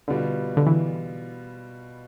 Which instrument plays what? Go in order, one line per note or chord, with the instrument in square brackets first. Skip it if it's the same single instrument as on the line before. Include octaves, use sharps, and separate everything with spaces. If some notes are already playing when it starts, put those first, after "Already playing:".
[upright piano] B2 G3 B3 F4 [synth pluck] D3
[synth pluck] D3
E3